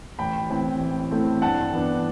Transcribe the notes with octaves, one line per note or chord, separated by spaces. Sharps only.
A1 G5 B5
A2 E3 A3 C4
A1
A2 E3 A3 C4
G2 F#5 A5
E3 B3 D4